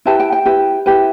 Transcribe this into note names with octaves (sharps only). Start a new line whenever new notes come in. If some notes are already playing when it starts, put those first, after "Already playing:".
E4 G4 B4 A5
G5
G5
E4 G4 B4
E4 G4 B4